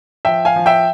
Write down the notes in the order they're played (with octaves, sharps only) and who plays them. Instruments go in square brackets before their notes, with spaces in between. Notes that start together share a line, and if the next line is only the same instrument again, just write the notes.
[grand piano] F3 E5 G5
F5 G#5
F3
E5 G5